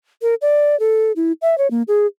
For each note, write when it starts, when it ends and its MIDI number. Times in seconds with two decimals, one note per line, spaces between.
0.22 0.35 70
0.42 0.78 74
0.80 1.12 69
1.16 1.32 64
1.42 1.58 76
1.58 1.70 73
1.71 1.82 58
1.88 2.06 68